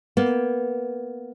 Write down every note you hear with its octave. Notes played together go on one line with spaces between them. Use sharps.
A#3 B3